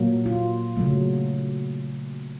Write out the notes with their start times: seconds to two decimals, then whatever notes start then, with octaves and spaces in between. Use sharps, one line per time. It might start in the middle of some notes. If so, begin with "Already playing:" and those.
Already playing: A#2 F#3 A#3
0.26 F4
0.77 C#3 F#3 A3